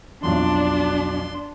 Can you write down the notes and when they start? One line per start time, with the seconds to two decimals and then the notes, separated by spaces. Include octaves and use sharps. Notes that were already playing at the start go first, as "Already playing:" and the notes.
0.23 B1 F2 F#3 D4 C6